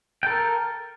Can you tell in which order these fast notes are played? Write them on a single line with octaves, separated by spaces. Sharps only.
G5 A4 A#4